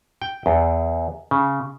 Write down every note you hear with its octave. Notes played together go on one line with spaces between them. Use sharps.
G5
E2
C#3